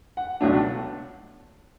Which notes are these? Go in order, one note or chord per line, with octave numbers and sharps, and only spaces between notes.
F#5
C#2 B2 F#3 A3 D4